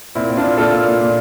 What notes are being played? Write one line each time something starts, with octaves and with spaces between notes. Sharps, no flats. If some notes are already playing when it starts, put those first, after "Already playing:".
A#2 C4 E4
A#2
D4 F4
A#2
A#2 F4 A4
A#2
A#2
A#2